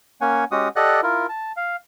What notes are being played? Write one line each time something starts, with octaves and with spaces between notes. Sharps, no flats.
A#3 C#4 C#5 F#5 G#5
G#3 C#4 F#4 G4 F#5 D#6
G4 A4 D5 D#5 F#5 F#6
E4 F4 A#4
A5
F5